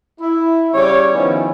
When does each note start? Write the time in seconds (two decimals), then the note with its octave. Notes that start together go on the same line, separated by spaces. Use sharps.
0.21 E4
0.74 C#3 G3 C#5
1.14 D#3 F3 B3 C#4 E4